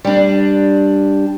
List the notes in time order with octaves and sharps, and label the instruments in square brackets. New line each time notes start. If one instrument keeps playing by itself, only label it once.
[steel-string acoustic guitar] G3 D4